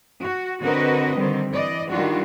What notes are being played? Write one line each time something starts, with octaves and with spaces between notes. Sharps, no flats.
F#4
D3 C4 F#4 A#4 B4 D#5
D3 D#3 G3 C4
E3 D5 D#5
D#3 E3 G3 D4 F4 F#4